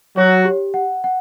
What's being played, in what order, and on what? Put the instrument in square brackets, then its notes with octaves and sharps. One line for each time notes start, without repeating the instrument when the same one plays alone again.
[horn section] F#3 F#4 [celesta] C#5
[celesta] G4
F#5
F#5